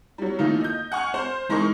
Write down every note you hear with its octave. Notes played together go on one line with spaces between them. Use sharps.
F#3 G3
D#3 E3 A3 A#3 D#4 F4
D#5 G6
F#5 G#5 C#6 F6
C5
E3 G#3 D#4 A#4 C#6